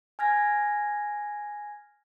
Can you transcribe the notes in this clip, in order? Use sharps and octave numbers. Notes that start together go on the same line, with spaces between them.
G#5 F6 G#6 A#6